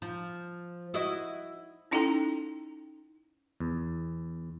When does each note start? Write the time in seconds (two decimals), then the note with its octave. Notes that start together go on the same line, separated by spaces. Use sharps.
0.02 F3
0.94 E4 F#4 D#5
1.91 C#4 D#4 E4 A4 G5 A#5
3.60 E2